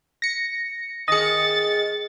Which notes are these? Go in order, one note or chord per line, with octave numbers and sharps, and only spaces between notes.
A#6 C#7
D#3 G#4 D#5 A6 C#7